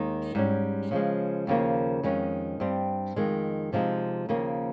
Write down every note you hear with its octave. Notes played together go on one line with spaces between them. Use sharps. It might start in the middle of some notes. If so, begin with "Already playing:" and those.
Already playing: D#2 D#3 G#3 D#4
G#2 G3 C#4
C#3 F3 G#3
D#2 C#3 F3 A#3
F2 D#3 G#3 C#4
G2 G3 C4
F2 D#3 G#3
C3 F3 G#3 D#4
D#2 C#3 F3 A#3